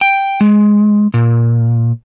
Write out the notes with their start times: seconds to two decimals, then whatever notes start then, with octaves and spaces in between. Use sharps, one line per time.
0.01 G5
0.41 G#3
1.14 A#2